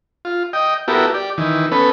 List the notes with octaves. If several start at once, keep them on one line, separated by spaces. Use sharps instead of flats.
F4
D#5 G5
B3 E4 F#4 G4 A4 A#4
G4 D5
D#3 E3
B3 C#4 A4 B4